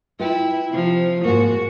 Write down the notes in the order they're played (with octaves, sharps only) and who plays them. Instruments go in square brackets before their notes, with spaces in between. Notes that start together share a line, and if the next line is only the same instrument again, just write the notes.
[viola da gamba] E4 [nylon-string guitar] F4 B4 G5
[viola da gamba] C3 F3
[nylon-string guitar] G#2 A#3 [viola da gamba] F#4